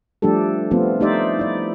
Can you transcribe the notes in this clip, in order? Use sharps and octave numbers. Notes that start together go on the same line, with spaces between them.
F3 G3 A3 D4 G4 A4
F3 A3 B3 C4 F4
A3 D#4 G4 C5 D5 E5
E4 D5